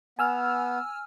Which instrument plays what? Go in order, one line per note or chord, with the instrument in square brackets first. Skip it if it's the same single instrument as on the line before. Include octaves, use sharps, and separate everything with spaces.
[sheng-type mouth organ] B3 [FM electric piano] G#5 E6 F6